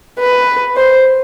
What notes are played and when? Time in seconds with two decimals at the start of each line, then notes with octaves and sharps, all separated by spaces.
0.19 B4
0.76 C5